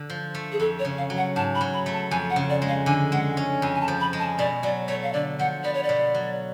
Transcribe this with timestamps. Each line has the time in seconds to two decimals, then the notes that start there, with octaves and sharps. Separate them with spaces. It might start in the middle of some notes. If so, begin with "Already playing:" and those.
Already playing: D3
0.10 F3
0.35 A3
0.52 G#4
0.60 F2 A4
0.79 C#5
0.85 C#3
0.98 F5
1.10 F#3
1.17 F#5
1.36 G#2 A5
1.55 B5
1.61 F#3
1.73 B5
1.86 A3
1.93 A5
2.11 F2 G#5
2.30 F#5
2.36 C#3
2.50 D5
2.62 G#3
2.68 F5
2.86 D3 G#5
3.12 G#3 F#5
3.37 C#4
3.62 F2 G#5
3.75 G#5
3.81 A5
3.88 F3
4.00 B5
4.13 G#3
4.19 A5
4.39 B2 D5
4.63 F#3 D5
4.88 A3 C#5
5.03 F5
5.13 D3 D5
5.39 F3 F#5
5.64 B3 D5
5.74 C#5
5.83 D5
5.89 B2
6.15 F#3